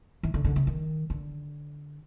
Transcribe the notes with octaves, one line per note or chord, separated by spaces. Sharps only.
E3
D3
D3
C#3
D#3
D3